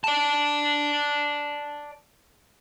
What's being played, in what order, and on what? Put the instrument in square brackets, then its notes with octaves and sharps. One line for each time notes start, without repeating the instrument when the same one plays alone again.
[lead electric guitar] D5 A5